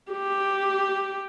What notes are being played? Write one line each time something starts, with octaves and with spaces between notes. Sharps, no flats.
G4